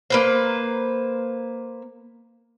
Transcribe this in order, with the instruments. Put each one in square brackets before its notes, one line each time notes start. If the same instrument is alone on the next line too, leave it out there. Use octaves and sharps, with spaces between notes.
[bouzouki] A#3 B4 C5